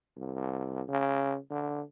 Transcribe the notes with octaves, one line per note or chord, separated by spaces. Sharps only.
C2
C#3
D3